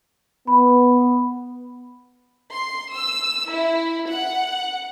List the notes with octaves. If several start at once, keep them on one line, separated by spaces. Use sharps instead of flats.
B3 B5
C6
E6
E4
F#5